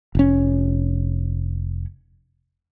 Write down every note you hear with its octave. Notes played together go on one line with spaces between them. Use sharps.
F1 C#4